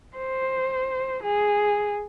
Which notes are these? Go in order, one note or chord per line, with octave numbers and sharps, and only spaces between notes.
C5
G#4